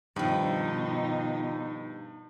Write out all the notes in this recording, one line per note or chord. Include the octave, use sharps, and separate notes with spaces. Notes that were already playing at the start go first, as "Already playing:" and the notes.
G2 B2 D#3 F3 D#4